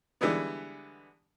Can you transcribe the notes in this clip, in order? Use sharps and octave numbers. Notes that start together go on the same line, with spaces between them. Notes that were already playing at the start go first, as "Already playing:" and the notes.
D3 E3 G3 G#3 B3